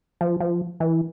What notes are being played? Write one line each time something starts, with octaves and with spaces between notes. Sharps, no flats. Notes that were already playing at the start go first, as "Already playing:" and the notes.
F3
F3
E3